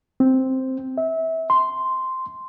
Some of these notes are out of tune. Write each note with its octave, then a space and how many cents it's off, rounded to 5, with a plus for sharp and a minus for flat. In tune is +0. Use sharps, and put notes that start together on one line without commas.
C4 +0
E5 -25
C6 -5